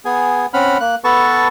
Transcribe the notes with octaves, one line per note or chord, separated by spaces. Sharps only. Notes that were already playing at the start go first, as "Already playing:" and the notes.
B3 G#4 G#5
C4 C#4 F#5 B5 F6
A#3 F#6
B3 A4 B4 A5 C#6